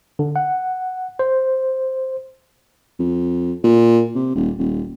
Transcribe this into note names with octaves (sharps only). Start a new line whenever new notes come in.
D3
F#5
C5
F2
A#2
C3
D#1
D#1